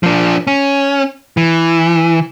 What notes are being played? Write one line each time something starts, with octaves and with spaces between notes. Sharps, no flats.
F3 D4
C#4
E3